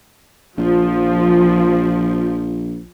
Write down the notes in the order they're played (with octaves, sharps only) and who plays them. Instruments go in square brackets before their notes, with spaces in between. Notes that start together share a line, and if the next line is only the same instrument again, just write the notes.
[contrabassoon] A#1 [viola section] F3